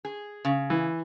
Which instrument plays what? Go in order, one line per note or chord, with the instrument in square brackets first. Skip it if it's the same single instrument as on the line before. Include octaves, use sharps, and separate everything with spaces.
[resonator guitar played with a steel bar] G#4
C#3
[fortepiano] E3